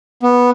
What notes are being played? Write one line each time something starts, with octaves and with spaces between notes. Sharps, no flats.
B3